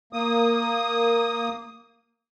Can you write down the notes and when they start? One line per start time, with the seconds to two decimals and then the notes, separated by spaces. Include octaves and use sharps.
0.13 A#3 D#6